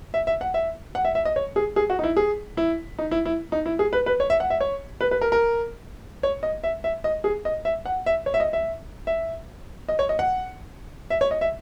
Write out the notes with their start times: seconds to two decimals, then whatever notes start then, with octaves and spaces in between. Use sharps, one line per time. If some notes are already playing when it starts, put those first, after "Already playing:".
0.14 E5
0.27 E5
0.41 F#5
0.54 E5
0.95 F#5
1.05 E5
1.15 E5
1.25 D#5
1.36 C#5
1.56 G#4
1.76 G#4
1.90 F#4
1.99 D#4
2.04 E4
2.17 G#4
2.57 E4
2.99 D#4
3.11 E4
3.25 E4
3.52 D#4
3.66 E4
3.79 G#4
3.93 B4
4.06 B4
4.20 C#5
4.30 E5
4.40 F#5
4.50 E5
4.60 C#5
5.01 B4
5.11 B4
5.21 A#4
5.32 A#4
6.23 C#5
6.43 D#5
6.64 E5
6.84 E5
7.04 D#5
7.24 G#4
7.45 D#5
7.65 E5
7.86 F#5
8.06 E5
8.26 C#5
8.34 E5
8.40 D#5
8.53 E5
9.07 E5
9.89 D#5
9.99 C#5
10.09 D#5
10.19 F#5
11.10 E5
11.21 C#5
11.31 D#5
11.41 E5